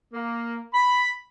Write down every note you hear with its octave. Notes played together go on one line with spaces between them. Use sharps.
A#3
B5